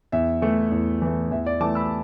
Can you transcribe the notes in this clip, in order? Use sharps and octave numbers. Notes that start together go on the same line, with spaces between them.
E2 E5
E3 A3
E2
E3 A3
E2 E5
D5
E3 A3 A5 D6
B5 E6